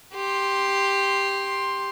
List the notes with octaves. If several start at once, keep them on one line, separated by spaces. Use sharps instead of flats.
G4 C6